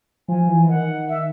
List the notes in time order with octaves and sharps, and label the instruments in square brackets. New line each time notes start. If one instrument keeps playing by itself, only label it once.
[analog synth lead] F3 [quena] G#5
[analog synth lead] E3
E3
[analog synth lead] D#3 [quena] F#5
[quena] E5